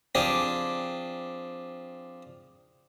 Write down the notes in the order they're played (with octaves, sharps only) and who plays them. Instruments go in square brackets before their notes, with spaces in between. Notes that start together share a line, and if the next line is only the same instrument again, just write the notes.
[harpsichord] F3 C4 D4 G4 G#4